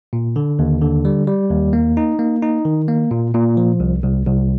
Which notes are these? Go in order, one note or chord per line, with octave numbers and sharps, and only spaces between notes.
A#2
D3
D#2
D3
G3
G3
D#2
A#3
D#4
A#3
D#4
D#3
A#3
A#2
A#2
F3
C2
C2
C2